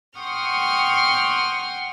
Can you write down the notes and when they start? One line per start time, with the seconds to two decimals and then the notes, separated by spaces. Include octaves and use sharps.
0.19 F#5 G5 C6 C#6 D#6 F6